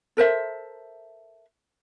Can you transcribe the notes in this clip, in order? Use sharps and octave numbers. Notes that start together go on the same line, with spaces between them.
A4 A#4 C5 E5